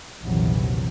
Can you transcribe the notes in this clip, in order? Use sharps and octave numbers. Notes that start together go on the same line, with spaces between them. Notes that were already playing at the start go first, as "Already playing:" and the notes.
A#1 E2 C3 D#3 E3 F#3